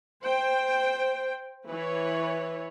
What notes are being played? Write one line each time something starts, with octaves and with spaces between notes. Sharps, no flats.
C5 G5
E3 B4 C#5